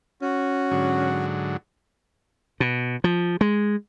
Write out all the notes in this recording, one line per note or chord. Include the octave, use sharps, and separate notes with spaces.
C#4 F#4
G#2 D3 F#3
B2
F3
G#3